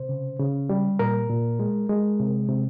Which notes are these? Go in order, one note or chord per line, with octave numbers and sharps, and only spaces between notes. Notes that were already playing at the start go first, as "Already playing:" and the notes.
Already playing: C3 C5
C#3
C#3
G3
A#2 A#4
A#2
G#3
G#3
C3
C3